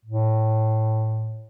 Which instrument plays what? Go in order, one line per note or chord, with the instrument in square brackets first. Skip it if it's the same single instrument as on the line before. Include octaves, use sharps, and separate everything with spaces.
[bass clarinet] A2